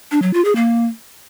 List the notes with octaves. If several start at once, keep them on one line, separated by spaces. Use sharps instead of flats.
D4
F#3
F4
G#4
A#3